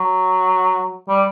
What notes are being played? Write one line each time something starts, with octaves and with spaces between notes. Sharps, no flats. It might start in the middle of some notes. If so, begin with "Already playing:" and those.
Already playing: F#3
G3